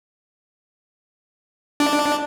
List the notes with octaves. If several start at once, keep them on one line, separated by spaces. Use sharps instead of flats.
D4